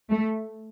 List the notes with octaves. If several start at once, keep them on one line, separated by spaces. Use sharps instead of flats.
A3